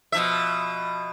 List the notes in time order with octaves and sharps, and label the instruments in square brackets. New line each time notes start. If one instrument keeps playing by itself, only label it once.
[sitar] B2 F3 E5